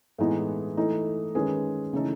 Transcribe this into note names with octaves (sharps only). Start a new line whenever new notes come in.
A2 E3 G#3 B3 D#4
E3 A3 D#4
D#3 G#3 C#4 G#4 B4
C#3 E3 A3 D#4 A4